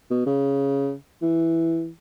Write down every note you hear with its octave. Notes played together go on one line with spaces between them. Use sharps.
B2
C#3
E3